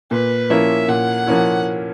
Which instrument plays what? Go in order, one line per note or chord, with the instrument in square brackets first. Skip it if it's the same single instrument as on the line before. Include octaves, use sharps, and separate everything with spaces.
[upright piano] A#2 [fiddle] B4
[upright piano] F3 A#3 C#4 E4 [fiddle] E5
[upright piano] A#2 [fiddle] F#5
[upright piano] F3 A#3 C#4 E4